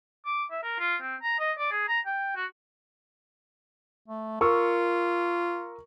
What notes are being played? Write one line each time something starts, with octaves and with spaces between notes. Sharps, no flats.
D6
E5
A#4
F4
C4
A#5
D#5
D5
G#4
A#5
G5
F#4
A3
F4 A#4 C#6 E6